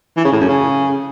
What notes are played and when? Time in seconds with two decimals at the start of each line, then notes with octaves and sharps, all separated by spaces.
0.17 E3
0.25 C#3
0.33 A2
0.41 F#2
0.48 C#3